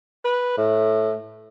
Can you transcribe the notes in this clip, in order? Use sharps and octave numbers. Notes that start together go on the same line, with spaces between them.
B4
A2